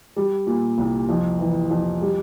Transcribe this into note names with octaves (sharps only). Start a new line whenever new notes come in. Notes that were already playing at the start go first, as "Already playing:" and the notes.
G3
A#2
C2
F2
E3
F2
G3